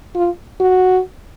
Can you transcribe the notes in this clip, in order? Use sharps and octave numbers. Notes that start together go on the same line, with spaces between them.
F4
F#4